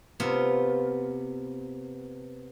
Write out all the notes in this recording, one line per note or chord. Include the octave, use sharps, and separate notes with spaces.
C3 B3 F4